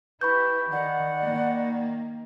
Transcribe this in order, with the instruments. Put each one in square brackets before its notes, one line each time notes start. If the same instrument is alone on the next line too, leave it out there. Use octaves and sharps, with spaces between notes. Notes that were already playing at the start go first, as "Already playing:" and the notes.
[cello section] E4 G4 [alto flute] B4 [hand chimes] B5 C#6 G6
[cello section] D#3 [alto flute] D5 [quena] F#5
[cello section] D#3 A#3